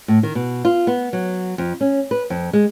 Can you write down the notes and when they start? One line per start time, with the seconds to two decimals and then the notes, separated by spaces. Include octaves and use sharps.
0.08 A2
0.23 D#3
0.35 B2
0.65 F4
0.87 B3
1.13 F#3
1.58 F2
1.81 C#4
2.11 B4
2.30 F2
2.53 G#3